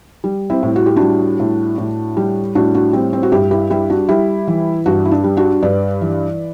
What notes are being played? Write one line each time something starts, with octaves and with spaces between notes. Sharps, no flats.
G3
C4 E4
A2
F#4
G4
G3 D4 F#4
A2
A2
G3
A2 D4 F#4
D4 F#4
G3 C4
C4
F#4
G2 E4 G4
E4 G4
G3 E4 G4
D4 F#4
G3 E4 G4
E3
G2 D4 F#4
E4
D4
G3
D4 F#4
G2 B4 D5
E3